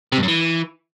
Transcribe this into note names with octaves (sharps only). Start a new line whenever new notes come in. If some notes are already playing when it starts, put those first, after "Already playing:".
C3
G2
F#2
E3